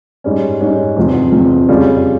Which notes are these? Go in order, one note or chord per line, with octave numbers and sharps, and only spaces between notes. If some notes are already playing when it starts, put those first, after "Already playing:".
G#2 G3 C#4
G#2 G3 C#4
E2 C3 F3
E2 C3 F3
F2 C#3 G3 C#4 F4